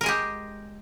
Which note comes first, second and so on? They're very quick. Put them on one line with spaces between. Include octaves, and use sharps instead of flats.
A#4 G#3 G#4 G4